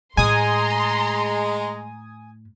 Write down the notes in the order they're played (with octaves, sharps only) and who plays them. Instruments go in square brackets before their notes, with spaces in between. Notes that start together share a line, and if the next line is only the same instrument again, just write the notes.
[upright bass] A2 [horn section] G#3 [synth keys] G#5 D#6 [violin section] A#5 C6